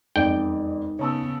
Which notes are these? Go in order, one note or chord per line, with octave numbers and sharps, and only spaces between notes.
E1 F2 D#4 D5 G5
C#3 B3 C#5 A5 E6